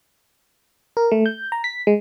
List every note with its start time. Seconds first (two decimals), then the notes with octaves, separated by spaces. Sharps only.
0.97 A#4
1.12 A3
1.26 G6
1.52 A#5
1.64 B6
1.87 G#3